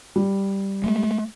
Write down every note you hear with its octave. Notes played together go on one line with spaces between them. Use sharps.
G3
G#3 A3